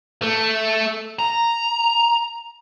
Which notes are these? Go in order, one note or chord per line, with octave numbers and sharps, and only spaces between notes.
A3
A#5